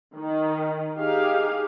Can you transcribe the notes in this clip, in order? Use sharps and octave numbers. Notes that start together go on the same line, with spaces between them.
D#3
D#4 G4 G#4 F5